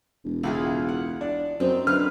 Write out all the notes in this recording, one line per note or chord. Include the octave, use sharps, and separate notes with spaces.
E1
C#2 E4 F4 G#4
F#5
D4
F#2 C4 D#4
D3 B4 F5 F6